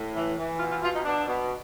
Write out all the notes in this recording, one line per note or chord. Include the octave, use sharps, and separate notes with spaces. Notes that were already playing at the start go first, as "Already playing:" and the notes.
Already playing: A2
E3
E3
B2 F4
F4
B2 F4
D#4
B2 D4
B2